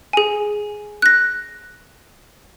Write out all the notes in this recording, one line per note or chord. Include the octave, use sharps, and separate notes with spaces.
G#4 G#5
F#6 A#6